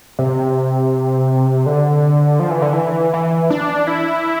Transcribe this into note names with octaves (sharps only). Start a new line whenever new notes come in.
C3
D3
F3
E3
D3
E3
E3
D4
E4